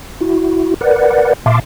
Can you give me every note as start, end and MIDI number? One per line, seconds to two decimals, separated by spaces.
0.21 0.74 64
0.21 0.74 66
0.81 1.33 70
0.81 1.33 71
0.81 1.33 74
0.81 1.33 78
1.46 1.60 46
1.46 1.60 76
1.46 1.60 77
1.46 1.60 81
1.46 1.60 84
1.46 1.60 86